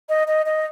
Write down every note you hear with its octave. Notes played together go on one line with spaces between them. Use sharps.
D#5
D#5
D#5